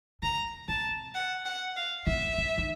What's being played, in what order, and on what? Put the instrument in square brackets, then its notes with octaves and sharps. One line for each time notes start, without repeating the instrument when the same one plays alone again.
[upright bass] C#3 [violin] A#5
[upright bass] C3 [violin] A5
[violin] F#5
F#5
F5
[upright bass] B2 [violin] E5
[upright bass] C3
D#3